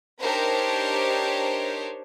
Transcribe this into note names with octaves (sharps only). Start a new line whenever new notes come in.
D4 D#4 G4 A#4 C5 C#5